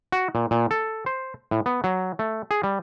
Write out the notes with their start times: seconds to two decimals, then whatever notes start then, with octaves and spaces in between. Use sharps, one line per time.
0.12 F#4
0.35 A#2
0.51 A#2
0.71 A4
1.06 C5
1.51 A2
1.66 B3
1.84 F#3
2.19 A3
2.51 G#4
2.63 G3